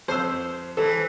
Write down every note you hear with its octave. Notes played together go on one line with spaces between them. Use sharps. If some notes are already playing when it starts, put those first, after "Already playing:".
F2 C5 E6
E3 A4